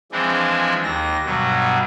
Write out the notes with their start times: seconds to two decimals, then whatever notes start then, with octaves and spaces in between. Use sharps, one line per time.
0.12 E3 F3 G#3 C4 D4 E4
0.84 D#2 A#6
1.26 G2 B2 F#3